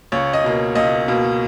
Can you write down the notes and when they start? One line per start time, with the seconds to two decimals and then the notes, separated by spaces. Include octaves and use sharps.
0.12 C#2 C#5
0.33 D#5
0.44 B2 A#3
0.75 C#2 D#5
1.08 B2 A#3